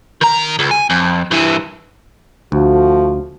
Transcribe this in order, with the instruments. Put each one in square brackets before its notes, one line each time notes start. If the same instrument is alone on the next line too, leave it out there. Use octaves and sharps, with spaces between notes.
[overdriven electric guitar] D#3 A#5
C#2
G#5
F2
G2 E3
[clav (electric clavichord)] D2 [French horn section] F3 A3 F#4